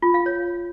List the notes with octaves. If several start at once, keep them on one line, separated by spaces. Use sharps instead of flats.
F4
F5
C#5